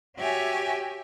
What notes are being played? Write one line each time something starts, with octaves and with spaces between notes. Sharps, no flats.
F#4 G4 C#5 E5 G#5